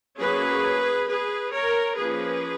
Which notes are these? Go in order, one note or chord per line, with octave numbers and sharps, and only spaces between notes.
F#3 A#3 C#4 G#4 B4
G#4 B4
A#4 C#5
F3 A#3 C#4 G#4 B4